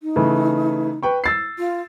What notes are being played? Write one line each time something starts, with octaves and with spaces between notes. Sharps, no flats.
D#4
C#3 E3 A3
B4 G5 C#6
E6 A6 C7
F4